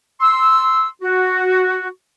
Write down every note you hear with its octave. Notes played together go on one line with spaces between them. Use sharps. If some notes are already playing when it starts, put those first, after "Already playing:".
C6 E6
F#4